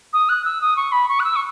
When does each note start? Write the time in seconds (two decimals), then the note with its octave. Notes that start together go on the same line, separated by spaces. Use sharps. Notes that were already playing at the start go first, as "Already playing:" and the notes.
0.13 D#6
0.29 F#6
0.45 E6
0.61 D#6
0.77 C#6
0.92 B5
1.09 C#6
1.20 F#6
1.24 E6
1.36 C#6